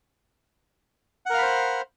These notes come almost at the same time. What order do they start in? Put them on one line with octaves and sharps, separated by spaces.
F#5 A#4 F5 B5 C5